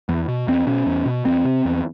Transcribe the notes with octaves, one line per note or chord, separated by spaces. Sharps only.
E2
B2
E2 C4
B2 C#4
E2
B2
E2 C4
C3
E2